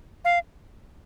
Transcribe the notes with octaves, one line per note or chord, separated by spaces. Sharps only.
F5